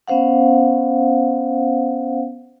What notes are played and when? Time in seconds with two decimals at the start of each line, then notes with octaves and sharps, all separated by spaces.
0.08 B3 C#4 C5 F5 F#5